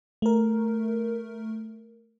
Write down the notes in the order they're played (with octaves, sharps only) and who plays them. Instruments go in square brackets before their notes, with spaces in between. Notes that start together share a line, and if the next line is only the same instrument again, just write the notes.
[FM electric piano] A3 A#4